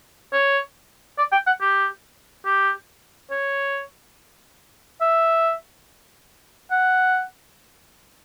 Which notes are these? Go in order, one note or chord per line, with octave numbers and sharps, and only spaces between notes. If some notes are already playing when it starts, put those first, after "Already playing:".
C#5
D5
G5
F#5
G4
G4
C#5
E5
F#5